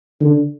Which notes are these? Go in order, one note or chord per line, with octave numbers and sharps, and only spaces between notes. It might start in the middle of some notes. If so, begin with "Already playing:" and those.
D3